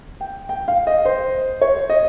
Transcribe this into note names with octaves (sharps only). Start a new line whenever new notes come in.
G5
G5
F5
D#5
C5
C#5
D#5